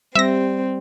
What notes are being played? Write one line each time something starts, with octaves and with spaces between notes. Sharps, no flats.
G3 C4 E5 A#6